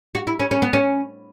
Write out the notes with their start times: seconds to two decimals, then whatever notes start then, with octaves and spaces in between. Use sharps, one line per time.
0.15 F#4
0.27 E4
0.39 C#4
0.51 C#4
0.62 B3
0.73 C#4